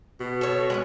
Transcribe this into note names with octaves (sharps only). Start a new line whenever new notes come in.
B2
A4 C#5
G#3 B3 C#4